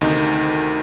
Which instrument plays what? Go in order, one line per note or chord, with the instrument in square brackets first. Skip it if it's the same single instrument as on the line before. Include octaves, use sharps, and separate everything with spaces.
[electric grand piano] D2 C3 D#3 D#4